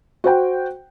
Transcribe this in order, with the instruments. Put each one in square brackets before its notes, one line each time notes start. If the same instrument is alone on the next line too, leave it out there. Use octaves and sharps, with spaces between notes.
[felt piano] F#4 C5 G5